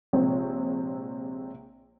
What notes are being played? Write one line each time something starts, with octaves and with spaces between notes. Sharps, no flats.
A#1 C3 G#3 C4 C#5